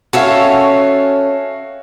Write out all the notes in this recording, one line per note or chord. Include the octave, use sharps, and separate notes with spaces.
C#4 F#4 A4 C#5 E5 F5